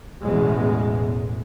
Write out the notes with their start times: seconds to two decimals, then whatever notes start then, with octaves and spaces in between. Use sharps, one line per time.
0.23 A1 E2 B2 G#3